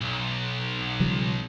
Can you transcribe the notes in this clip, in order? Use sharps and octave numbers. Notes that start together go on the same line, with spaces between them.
B1
C#3 F3 G3